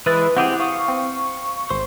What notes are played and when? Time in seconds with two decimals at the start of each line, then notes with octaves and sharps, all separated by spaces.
0.06 E3 G#3 E4 B4 D#6 F#6 A6
0.37 C4 E4 G4 G#4 F#5
0.60 F5 C#6 D#6
0.88 C4
1.71 G#1 C5